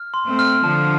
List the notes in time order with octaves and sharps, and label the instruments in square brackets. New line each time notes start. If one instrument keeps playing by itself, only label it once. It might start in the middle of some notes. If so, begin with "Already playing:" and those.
Already playing: [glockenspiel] F6
C6
[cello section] A3 C4
[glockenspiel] F6
[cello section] D3 F3 [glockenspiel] A5